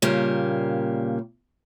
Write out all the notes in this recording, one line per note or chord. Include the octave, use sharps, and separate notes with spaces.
A#2 C#3 G3 A#3